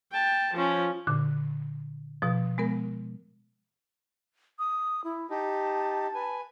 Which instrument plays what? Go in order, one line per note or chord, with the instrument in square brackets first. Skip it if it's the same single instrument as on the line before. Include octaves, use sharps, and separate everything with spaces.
[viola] G5 A5
F3 C#4
[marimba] A#2 D3
B2 F3
G#3 B3 A#4
[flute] D#6
E4
[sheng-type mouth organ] D#4 G4 [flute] A5
[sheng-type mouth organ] B4 G#5